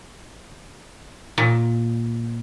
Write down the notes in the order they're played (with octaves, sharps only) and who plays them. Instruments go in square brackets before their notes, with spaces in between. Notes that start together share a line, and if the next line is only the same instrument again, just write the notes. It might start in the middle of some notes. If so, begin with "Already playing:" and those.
[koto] A#2